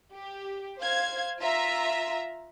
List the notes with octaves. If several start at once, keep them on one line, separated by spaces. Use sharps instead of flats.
G4
C5 F5 G#6
F4 E5 A#5